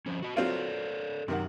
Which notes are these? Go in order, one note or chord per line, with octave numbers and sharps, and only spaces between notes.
F3 C4 C#4
F#4 D#5
F#3 C4 F4 A4 C#5 D5
F#2 C3 D#3 F#5